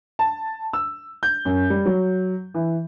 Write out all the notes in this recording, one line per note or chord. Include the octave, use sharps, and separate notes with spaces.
A5
E6
G6
F#2
G3
F#3
E3